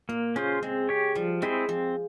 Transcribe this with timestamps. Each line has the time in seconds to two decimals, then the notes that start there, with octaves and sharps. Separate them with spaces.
0.09 A#2 A#3
0.36 C#3 C#4 F4 C5
0.63 G#3 C4
0.89 G4 C#5
1.15 F3 G3
1.42 G#3 C4 E4 G#4 C5
1.69 F3 C4